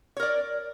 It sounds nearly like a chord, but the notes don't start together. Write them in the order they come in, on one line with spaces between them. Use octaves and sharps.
C#5 A#4 D5